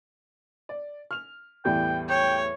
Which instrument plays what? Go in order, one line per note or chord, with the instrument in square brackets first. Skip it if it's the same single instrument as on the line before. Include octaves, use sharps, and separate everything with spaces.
[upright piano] D5
F6 F7
[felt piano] E2 [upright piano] A2 G3 B3 [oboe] G5
[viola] C#5 [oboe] G5